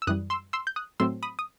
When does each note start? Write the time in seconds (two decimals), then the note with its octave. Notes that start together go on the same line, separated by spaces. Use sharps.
0.02 E6
0.07 F#2 E3 G3 D#6 F#6
0.30 C6 E6
0.53 C6 E6
0.67 G6
0.76 D#6 F#6
1.00 A2 F#3 A3 C4 C6 E6
1.23 B5 D#6
1.39 D#6